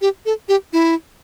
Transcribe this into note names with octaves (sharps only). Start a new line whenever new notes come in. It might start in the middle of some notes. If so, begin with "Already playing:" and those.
G4
A4
G4
E4